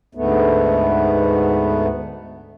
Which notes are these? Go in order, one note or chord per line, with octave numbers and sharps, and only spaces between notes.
D2 G#2 A3 B3